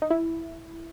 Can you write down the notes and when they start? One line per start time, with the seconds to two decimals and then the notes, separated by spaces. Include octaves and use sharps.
0.02 D#4
0.10 E4